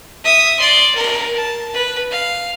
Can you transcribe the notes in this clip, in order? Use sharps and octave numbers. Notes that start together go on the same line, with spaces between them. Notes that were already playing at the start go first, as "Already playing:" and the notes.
E5 D#6
D5 C6
A#4
A5
B4
F5